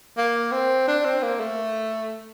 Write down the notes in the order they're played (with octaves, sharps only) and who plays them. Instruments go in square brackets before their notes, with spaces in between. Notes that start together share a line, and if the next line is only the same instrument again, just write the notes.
[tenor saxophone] A#3
C4
D4
C4
A#3
A3